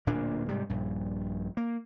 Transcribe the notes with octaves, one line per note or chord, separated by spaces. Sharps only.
D1 A#2 A#3 D4
G#2 C3 G3
A#1 G2
A#3